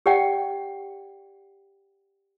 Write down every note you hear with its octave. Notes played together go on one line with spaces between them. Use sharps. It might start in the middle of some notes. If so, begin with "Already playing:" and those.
G4 D5 F#5 G5